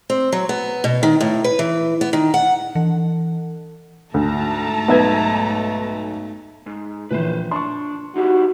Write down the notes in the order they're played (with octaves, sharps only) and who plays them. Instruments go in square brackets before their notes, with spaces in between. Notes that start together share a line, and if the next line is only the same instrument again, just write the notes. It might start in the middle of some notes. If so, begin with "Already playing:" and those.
[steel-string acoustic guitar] C4
F#3
B3
B2
D#3
A2
B4
E3
B3
D#3
F#5
[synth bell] E3
[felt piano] D2 [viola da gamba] G#2 A3 [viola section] A5 A#5
[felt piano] B1 B4 [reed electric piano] B3 E5 G#6
[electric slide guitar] G#2
[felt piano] A#1 E3 [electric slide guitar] B4 C5
[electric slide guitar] D4 [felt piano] C6 C#6
[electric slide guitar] D#4 E4 G4 [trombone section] F#4